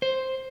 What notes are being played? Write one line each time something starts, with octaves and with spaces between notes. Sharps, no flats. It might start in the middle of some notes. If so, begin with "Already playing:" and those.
C5